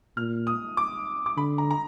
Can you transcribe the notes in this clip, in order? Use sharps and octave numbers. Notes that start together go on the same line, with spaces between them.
A#2 F6
D#6
D6
D6
D3 B5
A#5
A#5